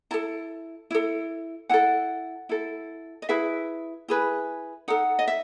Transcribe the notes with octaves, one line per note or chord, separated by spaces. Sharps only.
E4 A4 A5
E4 A4
E4 A4 F#5
E4 A4
D#5
E4 G#4 B4 E5
E4 G#4 B4
D#4 A4 F#5
D#5
E5